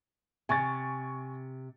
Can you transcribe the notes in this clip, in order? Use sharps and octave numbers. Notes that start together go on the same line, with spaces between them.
C3 G#5 C#6 A6